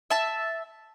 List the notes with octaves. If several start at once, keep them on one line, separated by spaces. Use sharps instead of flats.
E5 A5